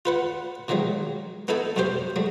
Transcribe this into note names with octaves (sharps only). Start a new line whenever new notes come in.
F4 B4 F#5
B2 D#3 F3 F#3 G#3
B3 D#4 E4 A4 G#5
F#2 B2 C#4 G4 C5
F#3 G#3 A3